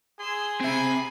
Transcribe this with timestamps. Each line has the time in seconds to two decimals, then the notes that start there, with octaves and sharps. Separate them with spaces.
0.19 G#4 C6 E6
0.61 C4 E5 G#5 B5